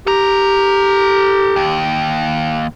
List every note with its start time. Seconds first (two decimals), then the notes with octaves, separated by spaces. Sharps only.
0.07 G4 A4 A#5
1.56 D#2